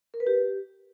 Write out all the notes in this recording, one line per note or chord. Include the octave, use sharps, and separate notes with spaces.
A#4
B4
G4